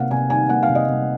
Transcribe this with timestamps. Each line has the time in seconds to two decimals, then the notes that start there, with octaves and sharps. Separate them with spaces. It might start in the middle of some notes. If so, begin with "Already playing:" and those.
Already playing: C3 A#3 F5 F#5
0.11 C3 G#5
0.30 D#3 G#5
0.49 A#3 F#5
0.63 F5
0.69 C3
0.75 D#5
0.89 C3